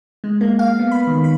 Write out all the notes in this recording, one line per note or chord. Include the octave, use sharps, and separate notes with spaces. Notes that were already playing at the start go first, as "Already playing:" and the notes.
G#3
A#3
F5
B3
B5
D#3
B5